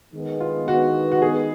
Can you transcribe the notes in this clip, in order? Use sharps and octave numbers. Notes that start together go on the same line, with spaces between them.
D#3 G#3 B3
F4
F#4
F#4
G#4